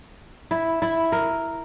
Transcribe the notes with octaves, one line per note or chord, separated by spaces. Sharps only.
E4
E4
A#4